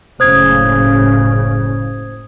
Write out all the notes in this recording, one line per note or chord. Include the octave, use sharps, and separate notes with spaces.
F#1 A2 C#3 C5 D#6 G#6